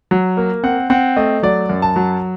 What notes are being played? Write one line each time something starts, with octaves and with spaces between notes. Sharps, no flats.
F#3
A#3
C4 F#5
C4 F#5
A3 D#5
F#3 D5
F#2
A5
F#3